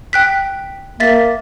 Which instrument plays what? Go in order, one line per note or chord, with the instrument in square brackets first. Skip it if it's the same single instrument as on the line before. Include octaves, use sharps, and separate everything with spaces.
[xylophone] G5 F#6 B6
[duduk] A#3 [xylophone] E5 A6 B6